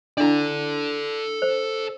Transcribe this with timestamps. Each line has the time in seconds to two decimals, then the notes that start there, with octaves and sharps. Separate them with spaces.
0.18 D4 E4 A4 D5
1.42 C5